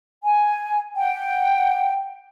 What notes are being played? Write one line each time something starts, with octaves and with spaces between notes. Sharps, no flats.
G#5
F#5 G5